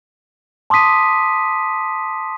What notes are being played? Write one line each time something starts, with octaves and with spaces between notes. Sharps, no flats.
A5 C6 D6 D#6 B6 D#7